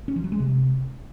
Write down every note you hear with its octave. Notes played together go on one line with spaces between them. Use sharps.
C#4
F3
F#3
G#3
C3